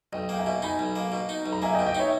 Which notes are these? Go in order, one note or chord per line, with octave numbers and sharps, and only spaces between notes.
B1 D#5 G5
A#3 G5
E5 G#5
B2
D#4 G#5 B5
B1
A#3
B2
D#4
B1
A#5
A#3 E5 G#5
D#5 G5
B2
D#5 G5
D#4 C#5 E5